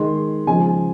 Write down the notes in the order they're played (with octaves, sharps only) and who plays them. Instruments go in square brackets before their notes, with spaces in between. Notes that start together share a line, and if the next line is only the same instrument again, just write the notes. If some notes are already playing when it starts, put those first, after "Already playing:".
Already playing: [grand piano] D#3 G#3 C6
C#3 F3 G#3 G#5